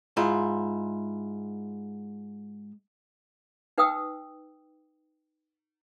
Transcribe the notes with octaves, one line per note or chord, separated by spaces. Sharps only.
G#2 E4 F4
D#4 B4 F#5 G5 D#6 E6